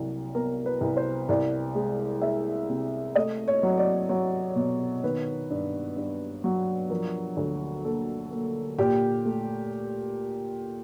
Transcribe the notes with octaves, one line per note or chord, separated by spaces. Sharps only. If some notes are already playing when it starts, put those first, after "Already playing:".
Already playing: C2 F#3
B3 A#4
B4
C2
C5
C2 D5
G#3
G#3 E5
C3
A3 D#5
C#5
F#3
C#5
D5
F#3 C#5
B2
D#3 B4
G2
G2
F#3
F3 A#4
D2
A#3 A4
A#3
A#2 G4
A3